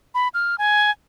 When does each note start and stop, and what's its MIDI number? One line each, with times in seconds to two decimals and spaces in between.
0.15 0.28 83
0.34 0.56 89
0.58 0.91 80